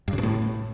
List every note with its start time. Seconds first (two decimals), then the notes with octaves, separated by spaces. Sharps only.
0.08 G2
0.13 C#3
0.18 B2
0.23 A2